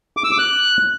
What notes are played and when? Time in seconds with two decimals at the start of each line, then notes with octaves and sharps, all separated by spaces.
0.17 D6
0.24 E6
0.31 D6
0.38 F#6